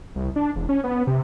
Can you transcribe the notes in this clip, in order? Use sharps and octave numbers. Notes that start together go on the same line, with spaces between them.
C2
D4
E1
C#4
B3
C3